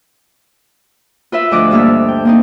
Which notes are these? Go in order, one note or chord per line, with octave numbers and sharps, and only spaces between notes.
F4 B4 E5
D2 F3 D#5 D6 F#6
G2 A#3 D4 E5 F6
G5
A#3 C4 D#4